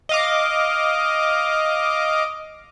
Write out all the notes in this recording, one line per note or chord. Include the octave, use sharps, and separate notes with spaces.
D#5 F5 D6